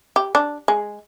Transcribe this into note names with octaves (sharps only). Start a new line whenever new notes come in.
G4
D4
G#3